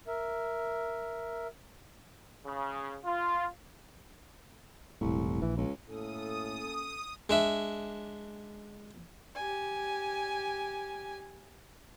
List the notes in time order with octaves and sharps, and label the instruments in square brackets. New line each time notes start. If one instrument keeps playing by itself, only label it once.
[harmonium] A#4 E5
[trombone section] C#3
F4
[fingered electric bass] E1 A2 [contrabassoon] C2
[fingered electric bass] A#1 [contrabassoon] E3
[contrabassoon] C#2
[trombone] A2 [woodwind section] A#3 C#4 A4 [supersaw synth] D#6
[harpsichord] G#3 D4 E5
[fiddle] G4 G#5